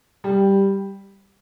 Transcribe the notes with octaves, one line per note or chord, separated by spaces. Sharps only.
G3